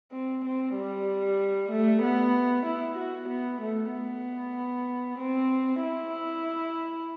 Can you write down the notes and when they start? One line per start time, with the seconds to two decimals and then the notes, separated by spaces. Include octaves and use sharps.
0.12 C4
0.45 C4
0.75 G3
1.71 A3
2.03 B3
2.66 E4
2.97 F#4
3.29 B3
3.61 A3
3.92 B3
5.19 C4
5.83 E4